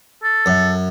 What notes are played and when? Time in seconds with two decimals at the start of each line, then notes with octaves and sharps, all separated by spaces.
0.23 A4
0.46 F#2